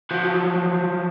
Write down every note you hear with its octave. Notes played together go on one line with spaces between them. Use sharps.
F3 F#3